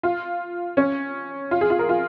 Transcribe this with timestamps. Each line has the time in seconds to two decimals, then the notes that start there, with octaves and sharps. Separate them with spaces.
0.03 F4
0.77 C#4
1.51 F4
1.61 G#4
1.70 F4
1.79 A#4
1.89 F4